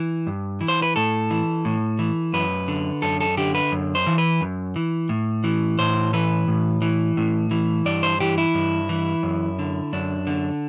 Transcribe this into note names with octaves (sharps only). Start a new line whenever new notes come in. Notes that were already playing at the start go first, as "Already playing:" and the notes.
Already playing: E3
G2
E3
C5
B4
A2 A4
E3
A2
E3
F#2 B4
D3
F#2 A4
A4
D3 G4
B4
F#2
C5
E3
B4
F#2
E3
A2
E3
A2 C5
E3 B4
A2
E3
A2
E3
G2 D5
C5
E3 G4
E4
G2
E3
F#2
D3
F#2 D4
D3